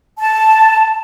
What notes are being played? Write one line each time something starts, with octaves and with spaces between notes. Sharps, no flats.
A5